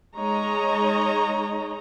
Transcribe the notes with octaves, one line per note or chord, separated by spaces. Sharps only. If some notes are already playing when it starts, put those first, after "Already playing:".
G#3 D#4 C#5 D#5 A#5